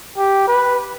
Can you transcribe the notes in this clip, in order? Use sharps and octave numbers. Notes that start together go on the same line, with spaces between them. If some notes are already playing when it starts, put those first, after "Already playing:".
G4
B4